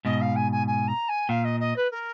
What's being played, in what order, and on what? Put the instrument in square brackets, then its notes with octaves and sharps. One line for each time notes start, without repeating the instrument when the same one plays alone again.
[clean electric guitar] G#2 B2 [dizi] D#5
[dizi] F5
G#5
G#5
G#5
A#5
G#5
[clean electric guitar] A#2 [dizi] F5
[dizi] D#5
D#5
B4
A#4